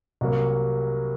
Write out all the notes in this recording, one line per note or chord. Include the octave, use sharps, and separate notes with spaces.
C2 C3 F#3 A#3